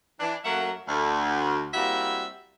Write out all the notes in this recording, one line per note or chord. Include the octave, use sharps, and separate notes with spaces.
E3 D4
F#2 F#3 A3 A#3 E5 F#5
D2
G3 A#3 C4 E4 F#4 E5